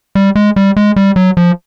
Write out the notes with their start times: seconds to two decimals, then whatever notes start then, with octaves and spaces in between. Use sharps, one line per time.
0.15 G3
0.36 G#3
0.56 G3
0.77 G#3
0.96 G3
1.16 F#3
1.37 F3